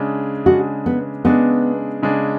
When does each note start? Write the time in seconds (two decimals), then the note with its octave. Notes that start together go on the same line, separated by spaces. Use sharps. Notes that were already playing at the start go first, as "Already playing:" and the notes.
Already playing: C#3 G#3 D4
0.46 C#3 G#3 D4 F#4
0.86 B3
1.24 C#3 G#3 B3 D4
2.02 C#3 G#3 D4